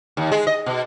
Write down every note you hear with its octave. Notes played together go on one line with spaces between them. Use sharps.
D#2
G#3
D#5
B2